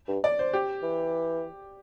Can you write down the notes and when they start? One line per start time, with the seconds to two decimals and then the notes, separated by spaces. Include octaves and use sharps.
0.09 G2
0.24 D5
0.39 C5
0.53 G4
0.83 E3